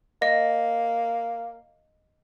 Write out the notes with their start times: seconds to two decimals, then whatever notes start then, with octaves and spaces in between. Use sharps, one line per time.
0.22 A#3 D#5